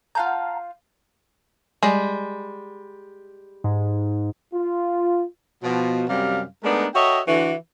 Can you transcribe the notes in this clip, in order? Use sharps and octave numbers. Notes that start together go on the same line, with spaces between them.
F4 F5 F#5 A5 A#5 G6
G3 G#3
G#2
F4
B2 F3
F#2 C3 G3 F5
G#3 A3 B3 D4 D#4 A#4
F#4 A4 C#5 D#5 E5 G5
D3 E3 F#4